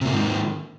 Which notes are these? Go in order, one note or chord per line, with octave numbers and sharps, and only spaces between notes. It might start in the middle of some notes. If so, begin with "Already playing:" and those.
G#2 C3 D#3 A#3